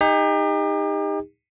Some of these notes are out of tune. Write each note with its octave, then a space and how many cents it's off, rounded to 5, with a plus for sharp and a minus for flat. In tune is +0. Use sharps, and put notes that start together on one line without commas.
D#4 +0 G4 +40